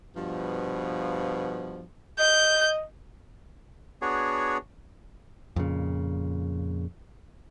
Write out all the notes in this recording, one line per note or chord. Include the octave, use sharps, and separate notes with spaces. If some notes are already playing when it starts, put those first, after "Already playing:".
G2 B2 F3
D#5 G6
B3 D4 F#4 G#4 C#5
F2 A#2 C#3